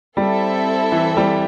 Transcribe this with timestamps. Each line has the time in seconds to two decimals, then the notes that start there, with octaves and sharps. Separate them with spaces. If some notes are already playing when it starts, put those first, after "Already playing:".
0.17 G3 C4 E4 A4 E5
0.92 E3
1.17 G3